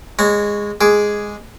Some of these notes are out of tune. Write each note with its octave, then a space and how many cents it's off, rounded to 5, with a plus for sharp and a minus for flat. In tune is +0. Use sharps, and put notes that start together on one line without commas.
G#3 -10 C#5 +0 A#5 -25
G#3 +0 G#4 +0 D6 -10